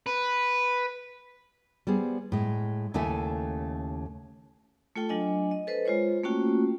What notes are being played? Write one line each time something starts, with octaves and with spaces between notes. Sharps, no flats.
B4
G3 B3 G#4 C5
A2 G#3
D#2 C#3 A3 E4 E5 G#5
A3 F4 A4 G5
F#3 D4 D#5 G#5
D#5
A4 B4 C5 D#5
G#3 F4 C5 C#5
A3 A#3 C#4 F4 F#4 G5